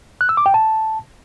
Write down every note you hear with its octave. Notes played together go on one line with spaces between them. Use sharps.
F#6
E6
D6
G5
A5